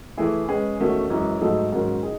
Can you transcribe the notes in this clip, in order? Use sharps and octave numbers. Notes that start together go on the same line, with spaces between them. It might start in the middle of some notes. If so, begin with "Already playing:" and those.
E3 A3 E4 G#4
G#3 C#4 G#4 B4
E2 D#3 A3 C#4 F#4
F#2 E3 G#3 C#4
G#2 F#3 A3 D#4 A4
G#2 D#3 F#3 C#4
D#4 G#4